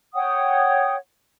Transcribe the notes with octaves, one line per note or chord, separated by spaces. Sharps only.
C#5 F#5 G5 D#6